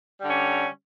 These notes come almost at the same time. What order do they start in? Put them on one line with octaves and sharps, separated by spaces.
G3 D3 C#4